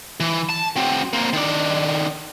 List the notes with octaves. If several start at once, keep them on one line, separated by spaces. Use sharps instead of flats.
E3
A5
F#3 C4
A#3 C4
D#3 D4